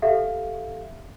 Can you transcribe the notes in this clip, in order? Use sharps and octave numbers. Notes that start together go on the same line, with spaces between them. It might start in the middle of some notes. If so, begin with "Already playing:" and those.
G4 A4 E5 F5